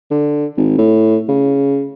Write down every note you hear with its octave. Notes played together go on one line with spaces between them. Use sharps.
D3
G#1
A2
C#3